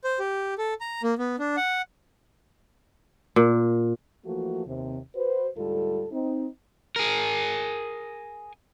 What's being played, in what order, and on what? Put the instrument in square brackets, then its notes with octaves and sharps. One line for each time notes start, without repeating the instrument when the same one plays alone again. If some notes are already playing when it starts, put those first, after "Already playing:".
[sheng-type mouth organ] C5
G4
A4
A#5
A#3
B3
D4
F#5
[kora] A#2
[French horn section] E3 F3 A3 A#3 F#4
D#2 C3
F#4 B4 C5
D2 G#2 G3 F4 A4
C4 D#4
[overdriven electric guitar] G#4 A#4